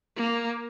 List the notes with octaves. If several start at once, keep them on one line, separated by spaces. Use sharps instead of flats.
A#3